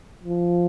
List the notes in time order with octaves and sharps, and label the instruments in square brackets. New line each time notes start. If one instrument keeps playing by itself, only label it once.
[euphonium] F3